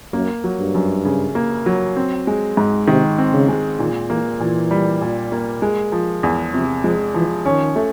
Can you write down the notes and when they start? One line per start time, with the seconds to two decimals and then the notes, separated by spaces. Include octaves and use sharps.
0.13 F#2 A#3
0.44 F#3
0.59 G2
0.74 F#2
1.05 C#3
1.35 A#3
1.66 F#3
1.96 C4
2.27 G#3
2.57 G#2
2.87 C3 D#3
3.18 C4
3.33 C#3
3.48 G#3
3.79 A#2 D#3
4.10 E3 A#3
4.40 A#2 E3
4.71 G3
5.01 A#2
5.32 A#3
5.62 G#3
5.92 F3
6.23 E2
6.54 C3 F3
6.84 F3 G#3
7.14 E3 F3
7.45 D#3 C#4
7.76 A3